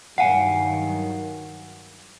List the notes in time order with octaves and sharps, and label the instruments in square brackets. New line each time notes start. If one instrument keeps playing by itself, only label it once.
[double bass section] G2 D#3 F#3 [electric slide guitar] F5 G#5 [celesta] F#5